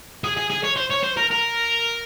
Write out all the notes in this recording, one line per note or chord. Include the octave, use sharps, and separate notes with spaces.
G#4
G#4
G#4
C#5
C5
C#5
C5
A#4
A#4